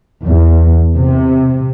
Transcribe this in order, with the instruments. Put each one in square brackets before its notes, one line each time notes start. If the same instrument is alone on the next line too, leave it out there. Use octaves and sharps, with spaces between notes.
[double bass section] E2
C3